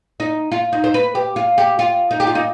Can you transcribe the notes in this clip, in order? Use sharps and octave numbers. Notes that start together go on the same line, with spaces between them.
D#4
F4
D#4
C5
B4
G4
F4
G4
F4
D#4
G4
F4
D#4